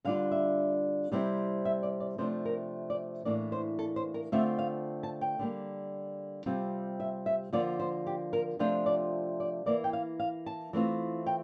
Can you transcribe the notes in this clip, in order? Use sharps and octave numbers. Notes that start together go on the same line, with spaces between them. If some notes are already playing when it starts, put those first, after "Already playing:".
D3 G3 D4 F4 F5
E5
C3 G3 C4 E4
E5
D5
D5
C3 F3 A3 D4 C5
A#4
D5
A2 E3 A#3 D4 D5
C5
A4
C5
A#4
D3 A3 C4 F4 E5
F5
A5
G5
D3 G3 A#3
C3 G3 C4 F4
E5
E5
D3 F3 A#3 F4 D5
C5
G4
A#4
C3 F3 A3 D4 F4 C5
D5
D5
E3 A#3 E4 D5
G5
F5
F5
A5
E3 A3 C4 F4
G5